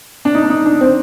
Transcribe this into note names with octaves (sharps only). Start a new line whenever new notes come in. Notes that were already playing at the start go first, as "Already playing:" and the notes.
D4
D#4
D4
D#4
D4
C4